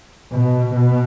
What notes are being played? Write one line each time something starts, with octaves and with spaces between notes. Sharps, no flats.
B2
B2